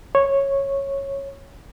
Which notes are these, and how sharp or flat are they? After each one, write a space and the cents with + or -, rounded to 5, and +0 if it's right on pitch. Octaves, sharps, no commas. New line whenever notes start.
C#5 -10